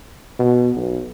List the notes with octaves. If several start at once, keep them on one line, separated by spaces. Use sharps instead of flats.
B2
B1